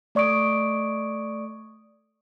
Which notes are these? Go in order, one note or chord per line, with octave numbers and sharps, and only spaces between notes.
A3 D5 C#6 D#6 D7